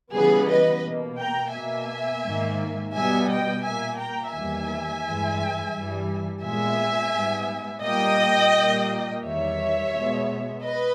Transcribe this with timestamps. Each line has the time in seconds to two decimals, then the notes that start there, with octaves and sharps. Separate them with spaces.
0.14 C#3 E3 G3 B3 G#4 B4
0.49 B4 D#5
0.84 B2 A#3
1.19 G5 A#5
1.54 B2 A#3 E5 G#5
2.24 G#2 D#3 A#3
2.93 B2 G3 B3 E5 G#5
3.29 D#5 G5
3.64 A#2 A#3 E5 G#5
3.99 G5 A#5
4.34 E2 D#3 G3 A#3 E5 G#5
5.04 G2 E3 G#3
5.74 G2 E3 G3
6.44 A#2 G#3 B3 E5 G#5
7.14 G#2 G3 B3
7.84 A#2 G3 A#3 D#5 G5
8.54 A#2 G3 A#3
9.24 E2 D#3 G3 C#5 E5
9.94 B2 G#3 B3
10.64 B4 D#5